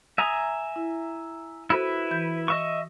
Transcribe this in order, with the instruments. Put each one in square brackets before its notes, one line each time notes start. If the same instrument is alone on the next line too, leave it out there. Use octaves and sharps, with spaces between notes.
[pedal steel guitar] E5 G#5 A#5 [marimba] D#6
[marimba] E4
[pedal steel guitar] E4 B4 [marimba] F#4 A4 C5
[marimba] E3 G6
[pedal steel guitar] D#5 E5 C#6